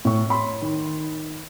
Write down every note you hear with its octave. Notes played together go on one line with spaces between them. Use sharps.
A2 C#6
C#5 B5 C6
D#3